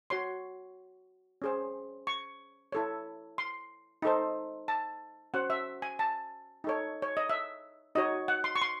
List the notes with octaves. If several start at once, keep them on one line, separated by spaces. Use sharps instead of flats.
F#4 C#5 C6
C#4 G#4 C5
C#6
E4 A4 C#5
C6
D#4 A4 C5
A5
C#4 F#4 C5 F#5
E5
G#5
A5
D#4 A4 C#5
C#5
D#5
E5
D#4 F#4 C#5 D#5
F#5
C6
C#6
C6